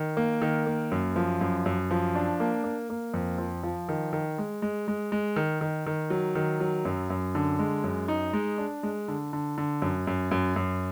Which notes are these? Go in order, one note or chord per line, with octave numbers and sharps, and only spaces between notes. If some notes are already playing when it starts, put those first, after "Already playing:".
Already playing: D#3
A#3
D#3
A#3
F#2
F3
F#2
F#2
F3
D4
A#3
A#3
A#3
F2
F3
F3
D#3
D#3
G#3
G#3
G#3
G#3
D#3
D#3
D#3
F#3
D#3
F#3
F#2
F#2
D3
G#3
F#2
D#4
G#3
D4
G#3
D3
D3
D3
F#2
F#2
F#2
F#2